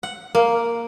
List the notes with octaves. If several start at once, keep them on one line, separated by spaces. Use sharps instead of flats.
F#5
A#3